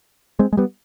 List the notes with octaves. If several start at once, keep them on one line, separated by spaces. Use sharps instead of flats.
G#3 C4
G#3
G3 B3